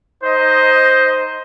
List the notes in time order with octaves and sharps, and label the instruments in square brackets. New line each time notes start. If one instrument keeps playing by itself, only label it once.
[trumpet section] D#4 C5 D#5